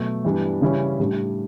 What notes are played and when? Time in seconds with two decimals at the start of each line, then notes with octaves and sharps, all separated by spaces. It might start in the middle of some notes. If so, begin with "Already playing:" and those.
Already playing: B2 F#3 A3
0.25 G2 E3 G3 B3 D4
0.61 C#3 E3 G3 C#4 E4
0.99 A2 G3 D4